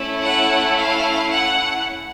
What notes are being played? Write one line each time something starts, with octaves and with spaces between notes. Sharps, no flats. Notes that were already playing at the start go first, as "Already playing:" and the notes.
Already playing: A3 C#4 E4
F#5
F5
F#5